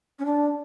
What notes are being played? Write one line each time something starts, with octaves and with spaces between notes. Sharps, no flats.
C#4
D4